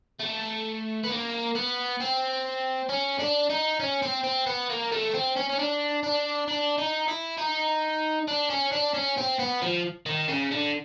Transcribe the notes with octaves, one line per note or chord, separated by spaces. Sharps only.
A3
B3
A#3
B3
C4
C#4
D4
D#4
C#4
C4
C4
B3
A#3
A3
C4
C#4
C#4
D4
D4
D4
D#4
E4
D#4
D4
C#4
D4
C#4
C4
B3
F3
D#3
C#3
D3